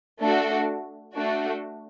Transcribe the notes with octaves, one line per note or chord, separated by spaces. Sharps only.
A3 D4 F#4 A4
A3 D4 F#4